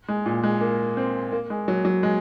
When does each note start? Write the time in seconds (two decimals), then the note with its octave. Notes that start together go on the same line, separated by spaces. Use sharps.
0.08 G#3
0.26 A#2
0.43 G#3
0.61 A#3
0.97 C4
1.32 A#3
1.50 G#3
1.68 F#3
1.85 F#3
2.03 G#3